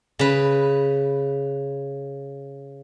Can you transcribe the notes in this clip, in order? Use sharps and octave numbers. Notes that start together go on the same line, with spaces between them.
C#3 B4